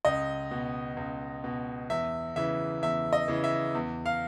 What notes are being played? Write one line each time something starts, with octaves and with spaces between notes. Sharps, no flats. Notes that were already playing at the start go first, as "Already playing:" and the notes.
C#2 D#5
B2
C#2
B2
E2 E5
C#3 E3 E5
E2 E5
D#5
C#3 E3
E5
E2
F5